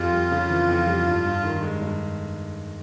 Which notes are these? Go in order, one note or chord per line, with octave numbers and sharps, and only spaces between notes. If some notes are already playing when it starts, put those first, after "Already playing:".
Already playing: F2 F4 G4
G3
C#3
E3
F2
G3
G2
G2
D#3
G#3
G2